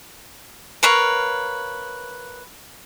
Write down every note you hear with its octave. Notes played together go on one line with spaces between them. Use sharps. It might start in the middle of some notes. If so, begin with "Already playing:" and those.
A#4 B4 C#5 F5